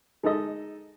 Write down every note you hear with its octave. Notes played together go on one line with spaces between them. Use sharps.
G#3 D#4 A4 D#5